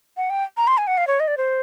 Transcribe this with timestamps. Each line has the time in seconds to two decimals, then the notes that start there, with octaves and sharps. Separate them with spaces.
0.17 F#5
0.30 G5
0.57 A#5
0.67 C6
0.78 G#5
0.87 F#5
0.98 F5
1.07 C#5
1.20 D#5
1.28 D5
1.37 C5